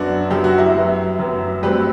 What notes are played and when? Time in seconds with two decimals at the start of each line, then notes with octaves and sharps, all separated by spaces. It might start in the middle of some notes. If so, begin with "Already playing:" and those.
Already playing: F#2 F#3 B3 D4 F#4
0.30 F#2 F#3 B3 G4
0.44 F#4
0.58 E4 G4
0.75 F#2 F#3 B3
1.19 F#2 F#3 B3
1.63 G2 F#3 A3 C4 G4 B4